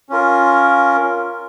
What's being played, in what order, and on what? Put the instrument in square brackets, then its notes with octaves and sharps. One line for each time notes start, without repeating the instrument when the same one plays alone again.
[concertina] C#4 F4 A#4